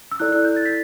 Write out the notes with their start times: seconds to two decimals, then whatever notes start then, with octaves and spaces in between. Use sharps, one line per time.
0.12 E6
0.19 E4 A4 D5 F#6
0.32 F#6
0.45 G6
0.56 A6
0.65 B6